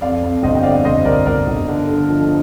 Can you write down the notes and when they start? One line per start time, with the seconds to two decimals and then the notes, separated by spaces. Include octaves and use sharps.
0.01 F2 D5 F5
0.23 F2
0.43 G1 C5 D#5
0.55 G5
0.63 F2 D5 F5
0.85 G1 C5 D#5
1.05 G1 A#4 D5
1.26 G1 A#4 D5
1.47 G1
1.68 D3
1.89 D3
2.09 F3